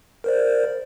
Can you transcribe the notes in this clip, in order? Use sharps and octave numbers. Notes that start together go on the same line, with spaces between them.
A#4 C5 D5